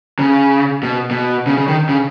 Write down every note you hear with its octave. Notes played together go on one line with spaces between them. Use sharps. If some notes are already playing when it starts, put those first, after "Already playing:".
C#3
B2
B2
C#3
C#3
D#3
C#3